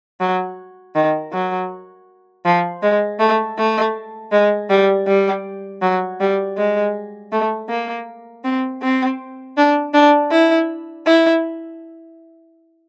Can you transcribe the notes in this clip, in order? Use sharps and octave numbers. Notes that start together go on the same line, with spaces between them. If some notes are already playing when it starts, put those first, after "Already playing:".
F#3
D#3
F#3
F3
G#3
A3
A3
G#3
G3
G3
F#3
G3
G#3
A3
A#3
C4
C4
D4
D4
E4
E4